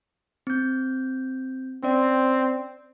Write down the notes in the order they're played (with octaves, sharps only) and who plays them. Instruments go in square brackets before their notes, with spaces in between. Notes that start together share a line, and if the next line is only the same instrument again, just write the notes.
[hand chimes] C4 G6
[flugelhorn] C4 [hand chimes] C#4 D5